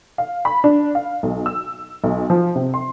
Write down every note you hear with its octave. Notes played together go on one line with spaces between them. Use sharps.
F5
B5
D4
F5
B1
E6
B1
F3
C3
C6